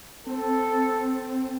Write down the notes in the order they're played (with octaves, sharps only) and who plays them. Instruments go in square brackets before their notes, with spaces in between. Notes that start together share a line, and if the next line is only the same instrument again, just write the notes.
[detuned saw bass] C4 [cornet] A4